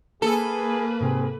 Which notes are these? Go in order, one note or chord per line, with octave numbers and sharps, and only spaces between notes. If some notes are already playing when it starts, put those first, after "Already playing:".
A#3 G#4 A4 B4
G#2 C3 C4 G#4